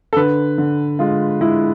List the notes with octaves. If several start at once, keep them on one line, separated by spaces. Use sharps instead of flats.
A4
D3 B4
D3
G#3 F4
G#3 E4